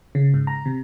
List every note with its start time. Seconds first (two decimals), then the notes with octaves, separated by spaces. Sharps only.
0.15 C#3
0.34 G#2
0.47 A#5
0.65 C3